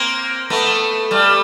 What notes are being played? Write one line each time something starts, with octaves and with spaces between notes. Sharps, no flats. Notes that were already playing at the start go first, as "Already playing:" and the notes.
Already playing: A#3 C4
A3 B3
G3 A3